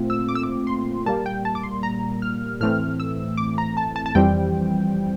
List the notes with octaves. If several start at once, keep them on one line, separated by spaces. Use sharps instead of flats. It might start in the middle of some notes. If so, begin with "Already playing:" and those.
Already playing: A#2 A3 C4 F4
E6
D6
E6
D6
C6
A#2 G3 A#3 A5
G5
A5
D6
C6
A#5
F6
A2 E3 A3 C4 F6
E6
D6
A#5
A5
A5
A5
F2 E3 G3 C4 G5